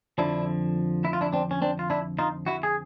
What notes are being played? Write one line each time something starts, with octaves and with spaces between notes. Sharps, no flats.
F2 D3 F3 D4 E4
E4
F4
D4 E4
C4 D4
C#4
C4 D4
F4
D4 E4
D#4 F4
E4 F#4
G#4